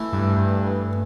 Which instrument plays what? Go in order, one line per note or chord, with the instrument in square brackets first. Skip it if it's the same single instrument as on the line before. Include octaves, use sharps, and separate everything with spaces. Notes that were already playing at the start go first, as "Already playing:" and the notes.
Already playing: [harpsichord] E3 A3 E4
[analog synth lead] G2
G2